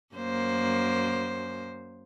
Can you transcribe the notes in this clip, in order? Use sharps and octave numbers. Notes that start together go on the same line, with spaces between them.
F#2 A#3 C5